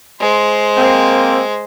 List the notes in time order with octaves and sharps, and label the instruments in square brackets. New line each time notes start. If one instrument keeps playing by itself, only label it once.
[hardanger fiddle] G#3 C5
[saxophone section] A#3 C4